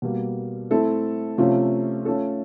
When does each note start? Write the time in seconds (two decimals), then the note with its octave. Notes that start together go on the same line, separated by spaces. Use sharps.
0.02 B2 G3 A#3
0.70 A3 C4 E4 A4
1.38 C3 F3 A3 C#4 F4
2.05 A3 C#4 F4 A4